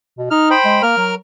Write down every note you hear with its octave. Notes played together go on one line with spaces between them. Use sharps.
B2
D#4 F6
C5 G5 B5
G#3
A#3 A#4 F6
F#3